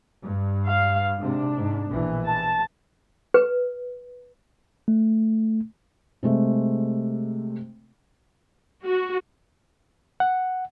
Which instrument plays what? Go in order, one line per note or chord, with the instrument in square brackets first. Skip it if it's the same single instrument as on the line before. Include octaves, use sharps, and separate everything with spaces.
[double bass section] G2
[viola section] F5
[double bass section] G#2 C3 [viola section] D4
[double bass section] G#2
A#1 B2 E3
[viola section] A5
[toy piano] B4
[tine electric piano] A3
[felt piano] C3 G#3 A3
[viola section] F#4
[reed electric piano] F#5